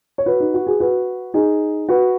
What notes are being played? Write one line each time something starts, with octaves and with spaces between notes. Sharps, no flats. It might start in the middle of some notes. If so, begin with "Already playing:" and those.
C#5
F#4 B4
D#4
F#4
G#4
F#4 B4
D#4 G#4
F#4 B4